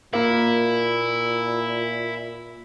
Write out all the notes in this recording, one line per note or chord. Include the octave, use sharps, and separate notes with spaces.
A#2 A#3 E4